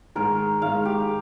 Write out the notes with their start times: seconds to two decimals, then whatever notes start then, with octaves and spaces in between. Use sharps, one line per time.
0.16 G#2 D#3 G#3 A#4
0.62 G#2 D#3 G#3 F5
0.85 G4